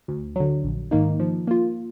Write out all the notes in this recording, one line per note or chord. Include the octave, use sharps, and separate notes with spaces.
D2
D3 F#3
A#1
G#2 D#3 A#3 D#4
F3
A#3 F4